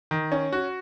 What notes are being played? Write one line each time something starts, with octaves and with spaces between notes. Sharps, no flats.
D#3
C#4
F#4